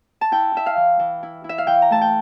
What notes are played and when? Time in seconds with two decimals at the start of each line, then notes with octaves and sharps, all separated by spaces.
0.21 A5
0.32 E4 G5
0.54 E4 E5
0.66 F5
0.77 E3
0.99 E3
1.23 E4
1.44 E4
1.49 E5
1.58 F5
1.67 E3 G5
1.82 A#5
1.91 A3 A5
2.01 G5